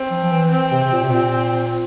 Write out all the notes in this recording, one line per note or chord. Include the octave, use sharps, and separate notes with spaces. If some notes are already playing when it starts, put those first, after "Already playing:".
Already playing: C4
F3
F3
E3
C4
C3
C3
A#2
C3
A#2 C4